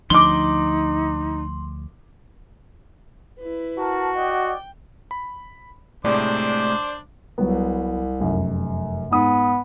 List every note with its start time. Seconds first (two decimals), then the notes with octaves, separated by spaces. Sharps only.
0.10 D2 F3 D4 D#4 C6 D6 G7
3.40 E4 B4
3.78 F#4 A#4 A5
4.15 D5 D#5 F#5 G5
5.11 B5
6.05 A2 C3 G#3 A3 D4 C5 D5 D6
7.38 C2 F#3 G3 B3
8.20 F1 F#2
9.11 G#2 B3 D#6